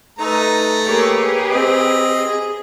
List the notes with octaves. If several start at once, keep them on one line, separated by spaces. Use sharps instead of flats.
A3 D#4 B4 A#5
A#3 G4 G#4 B4 C#5
C4 D#5
G#4